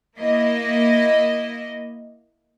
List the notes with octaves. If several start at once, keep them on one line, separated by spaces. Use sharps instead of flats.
A#3 E4 D#5